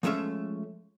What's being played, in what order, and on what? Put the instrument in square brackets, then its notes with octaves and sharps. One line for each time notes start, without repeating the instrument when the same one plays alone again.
[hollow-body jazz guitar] F3 G#3 A3 C#4 E5